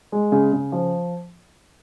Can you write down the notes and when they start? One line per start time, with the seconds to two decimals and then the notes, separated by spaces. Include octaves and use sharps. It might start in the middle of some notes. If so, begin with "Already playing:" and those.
0.12 G#3
0.32 C#3
0.53 C#3
0.72 F3